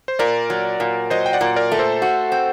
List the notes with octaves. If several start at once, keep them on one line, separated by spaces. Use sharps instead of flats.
C5
A#2 A#4 D5
F#3
A#2
F#3 C5 D#5
G5
D5 F#5
A#2
A#4 D5
A3
A4 C5
F#4
C4